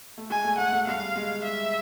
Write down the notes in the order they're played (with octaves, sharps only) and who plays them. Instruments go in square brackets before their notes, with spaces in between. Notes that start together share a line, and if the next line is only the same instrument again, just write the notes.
[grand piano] A3
[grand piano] G#3 [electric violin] G#5
[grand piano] A3
[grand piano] A3 [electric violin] F#5
[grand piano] A3
[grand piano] G3 [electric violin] F5
[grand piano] G#3
[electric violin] E5